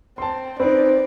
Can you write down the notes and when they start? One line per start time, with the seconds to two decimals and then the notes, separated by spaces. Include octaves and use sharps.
0.18 C4 A5 C6
0.60 C4 D#4 B4 D5